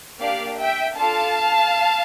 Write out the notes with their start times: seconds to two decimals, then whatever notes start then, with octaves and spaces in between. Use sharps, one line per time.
0.20 A#3 D4 G4 D5 F5
0.59 E5 G5
0.97 D4 F4 A4 F5 A5